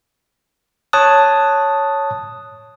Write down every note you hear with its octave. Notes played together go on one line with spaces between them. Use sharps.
C#5 A5 D#6 F#6